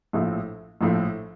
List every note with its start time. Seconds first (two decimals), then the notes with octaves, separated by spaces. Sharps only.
0.13 A#1 A2 F3 A3
0.81 A#1 A2 F3 A3